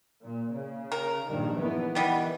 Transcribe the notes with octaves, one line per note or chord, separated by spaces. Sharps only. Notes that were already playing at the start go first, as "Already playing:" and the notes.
A#2
C#3
A#4
A#1 G2 D#3
E3 B3
D#3 E3 G3 B3